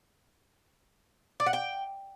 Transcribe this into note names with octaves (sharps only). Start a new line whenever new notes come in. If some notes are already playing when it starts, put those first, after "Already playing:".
D5
F#5
G5